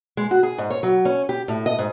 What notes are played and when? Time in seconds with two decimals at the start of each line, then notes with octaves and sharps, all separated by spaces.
0.17 G#3
0.31 F#4
0.43 G#4
0.58 G#2
0.70 C#5
0.83 F#3
1.05 C#4
1.29 G4
1.48 A2
1.66 D#5
1.79 G#2